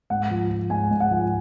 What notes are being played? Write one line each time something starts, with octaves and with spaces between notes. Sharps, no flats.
G#2 F#5
F3
F3
G#2 G#5
G#2
F#5
F3